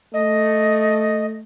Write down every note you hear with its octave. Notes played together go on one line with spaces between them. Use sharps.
A3 D#5